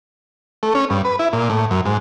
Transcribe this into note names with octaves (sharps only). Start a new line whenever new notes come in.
A3
C#4
G2
B4
E4
A#2
A2
F#2
G#2